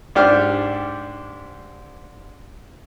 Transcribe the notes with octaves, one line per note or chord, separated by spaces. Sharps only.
G#2 D4 G4 F6